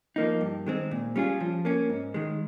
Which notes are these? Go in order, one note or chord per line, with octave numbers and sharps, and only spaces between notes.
F3 A#3 D#4
G2
D#3 G#3 C4
A#2
G3 C#4 F4 G#4
F3
A#3 C#4
G#2
D#3 G#3